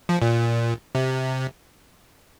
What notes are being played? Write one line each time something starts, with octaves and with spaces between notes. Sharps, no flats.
F3
A#2
C3